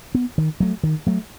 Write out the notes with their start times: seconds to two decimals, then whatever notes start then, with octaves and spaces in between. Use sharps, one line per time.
0.15 B3
0.38 D#3
0.60 F#3 A3
0.83 D#3
1.07 F#3 A3